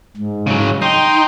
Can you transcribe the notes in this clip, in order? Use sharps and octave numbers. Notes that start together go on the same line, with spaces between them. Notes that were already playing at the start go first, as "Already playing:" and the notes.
G#2
C#3 F#3
D#4 G5 C6